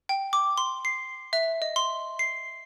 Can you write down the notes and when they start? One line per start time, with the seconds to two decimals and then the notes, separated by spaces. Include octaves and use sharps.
0.09 G5
0.33 D6
0.58 C6
0.85 C7
1.33 E5
1.62 D#5
1.76 C6
2.19 C7